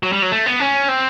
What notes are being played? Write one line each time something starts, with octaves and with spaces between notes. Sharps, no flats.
F#3
G3
F#3
A3
B3
C#4
C4